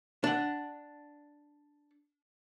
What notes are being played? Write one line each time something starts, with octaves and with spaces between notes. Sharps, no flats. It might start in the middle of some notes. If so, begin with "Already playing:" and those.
D4 F#5